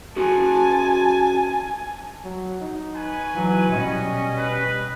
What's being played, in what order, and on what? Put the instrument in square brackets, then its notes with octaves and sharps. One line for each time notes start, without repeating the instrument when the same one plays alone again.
[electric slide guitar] C#4 F#4 G#4 [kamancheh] G#5 A5
[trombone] F#3
D#4
[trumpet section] B4 C#5 G#5
[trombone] E3 [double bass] F#3
[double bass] B2 C#4 [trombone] G3 [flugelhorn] D#5
[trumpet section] B4